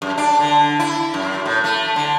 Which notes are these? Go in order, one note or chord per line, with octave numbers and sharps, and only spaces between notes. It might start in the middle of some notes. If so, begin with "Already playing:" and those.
F#2
D4
D3
E4
F#2
A2
A3
D3